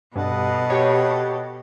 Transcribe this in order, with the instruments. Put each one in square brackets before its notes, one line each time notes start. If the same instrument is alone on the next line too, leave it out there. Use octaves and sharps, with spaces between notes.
[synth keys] G2 [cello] B2 [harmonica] A4 D#5 F#5
[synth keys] G4 C#5